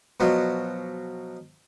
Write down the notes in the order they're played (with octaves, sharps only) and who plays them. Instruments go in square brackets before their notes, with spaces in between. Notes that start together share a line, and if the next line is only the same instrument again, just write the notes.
[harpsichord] B2 F3 F#3